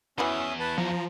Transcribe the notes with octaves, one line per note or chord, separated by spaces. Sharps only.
E2 E3 C#4 E4 F#4 E5 D#6
B4 A5
F3 A#5